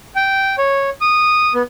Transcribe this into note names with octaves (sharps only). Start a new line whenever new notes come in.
G5
C#5
D#6
B3